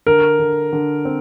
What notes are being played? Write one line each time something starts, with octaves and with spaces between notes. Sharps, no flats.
D3 A#4
D3
D3
C4